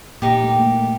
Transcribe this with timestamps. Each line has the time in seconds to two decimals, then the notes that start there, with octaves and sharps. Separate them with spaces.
0.22 A#2 A#3 D#4 G4 A#4
0.44 A3
0.60 A#3
0.67 A3